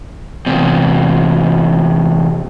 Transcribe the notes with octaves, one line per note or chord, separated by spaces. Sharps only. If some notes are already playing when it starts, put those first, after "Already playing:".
E2 C3